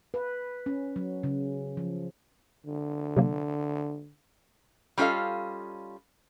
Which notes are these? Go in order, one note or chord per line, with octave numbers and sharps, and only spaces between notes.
B4
C#4
F#3
C#3
F3
D3
C3 F#3 A#3
G3 C#4 F4 A4 D#5 F5